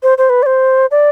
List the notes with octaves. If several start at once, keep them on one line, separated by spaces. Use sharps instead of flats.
C5
C5
B4
D5
C5
D5